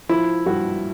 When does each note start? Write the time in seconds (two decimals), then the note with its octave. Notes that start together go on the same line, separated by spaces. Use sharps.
0.09 F3 E4
0.46 G2 F#4